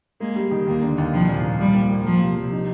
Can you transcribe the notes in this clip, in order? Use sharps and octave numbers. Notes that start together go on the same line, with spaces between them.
G#3 A#3
G3
D#3
D#2 A#3
D3
D#2
C2 F3
A#2
A#2
F3 G3
A#3
A#3
F3 A#3
C3
C3
D#4